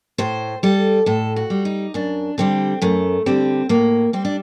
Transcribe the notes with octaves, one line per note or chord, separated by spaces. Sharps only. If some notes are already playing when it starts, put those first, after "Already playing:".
A2 C5
G3 A4
A2 A4
F#4
G3
D#4
F#2 D4
D3 G3 C4
F#2 A3
D3 G3 C4
A2 A#3
G3 C4
D4